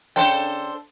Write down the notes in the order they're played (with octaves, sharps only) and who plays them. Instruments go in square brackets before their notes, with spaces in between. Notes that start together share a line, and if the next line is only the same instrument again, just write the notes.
[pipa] C#3 G5 [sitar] D4 A4 C5